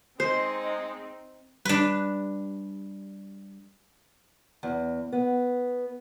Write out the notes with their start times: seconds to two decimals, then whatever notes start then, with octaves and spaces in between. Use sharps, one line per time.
0.20 G#3 C4 D#4 C5
1.65 G3 D4 B4
4.63 E2
5.12 B3